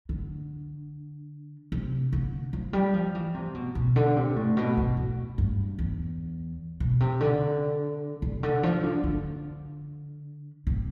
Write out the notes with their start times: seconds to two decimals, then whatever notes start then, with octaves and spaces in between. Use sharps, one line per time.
0.09 D3
1.72 C3
2.13 D3
2.53 F3
2.73 G3
2.94 F3
3.15 E3
3.34 C3
3.54 B2
3.75 B2
3.96 D3
4.16 C3
4.36 A2
4.57 B2
4.77 B2
4.97 A2
5.38 G2
5.79 E2
6.80 B2
7.00 C3
7.21 D3
8.22 C3
8.43 D3
8.63 F3
8.83 D3
9.04 D3
10.67 C3